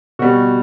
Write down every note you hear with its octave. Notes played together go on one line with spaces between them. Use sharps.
B2 G3 F#4